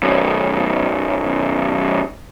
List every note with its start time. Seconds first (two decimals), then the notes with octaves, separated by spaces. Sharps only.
0.03 B1 F#2